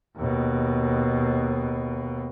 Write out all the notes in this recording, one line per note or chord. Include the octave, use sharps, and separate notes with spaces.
D#2 B2